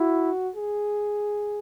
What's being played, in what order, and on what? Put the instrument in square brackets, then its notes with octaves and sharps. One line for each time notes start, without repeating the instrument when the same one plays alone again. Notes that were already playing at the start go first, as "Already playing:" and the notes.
Already playing: [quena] E4 [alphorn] F#4
[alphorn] G#4